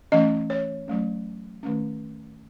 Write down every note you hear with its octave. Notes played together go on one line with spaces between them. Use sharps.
E3 A3 C#4 D#5
C#5
F#3 A3 C#4
D#3 A3 C#4